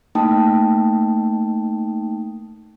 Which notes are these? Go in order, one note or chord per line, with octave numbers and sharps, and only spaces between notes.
A3 A#3 D#4 G5 A5 D#6